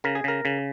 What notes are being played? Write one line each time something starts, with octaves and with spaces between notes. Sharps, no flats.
C#3 A#4
G#4
C#3 A#4
C#3